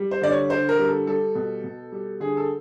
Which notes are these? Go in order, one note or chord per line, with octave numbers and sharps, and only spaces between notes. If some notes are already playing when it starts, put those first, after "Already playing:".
Already playing: G3
C5
D3 D5
C#5
D3 C5
A#4
G3
A4
G3 A4
B2
B2
G3
D3 G#4
A4